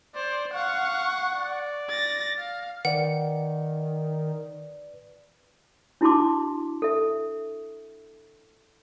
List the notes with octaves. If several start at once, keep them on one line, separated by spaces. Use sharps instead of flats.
C5 D5
F5 F#5 C#6
D5
A6 A#6
F5
D#3 B4 D5 F#5
D4 E4 F#4 A5 C6 D6
A4 E5